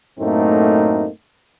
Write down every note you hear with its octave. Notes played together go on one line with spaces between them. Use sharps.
F#2 A2 A3 A#3 C4 D#4